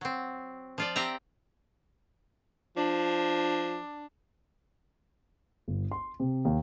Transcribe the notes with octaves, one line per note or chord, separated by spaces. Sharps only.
F#3 C4
F3 F4 D5
C4 G4 E5 A#5
F3 D4
G1
C6
C3
D#2